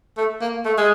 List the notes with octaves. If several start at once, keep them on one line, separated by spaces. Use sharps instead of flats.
A3
A#3
A3
G#3